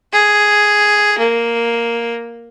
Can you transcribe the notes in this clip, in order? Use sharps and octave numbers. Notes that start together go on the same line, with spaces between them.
G#4
A#3